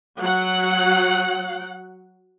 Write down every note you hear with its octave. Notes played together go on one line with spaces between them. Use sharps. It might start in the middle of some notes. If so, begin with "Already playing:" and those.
F#3 F#5